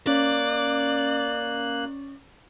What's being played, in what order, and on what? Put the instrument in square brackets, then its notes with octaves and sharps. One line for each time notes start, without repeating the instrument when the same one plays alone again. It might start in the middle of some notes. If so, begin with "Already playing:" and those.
[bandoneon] A#3 F#6 [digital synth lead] C#4 [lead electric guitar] D5